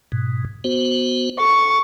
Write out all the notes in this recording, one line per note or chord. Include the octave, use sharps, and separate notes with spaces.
G#2 B2
B3 F#4 C5
A4 C#6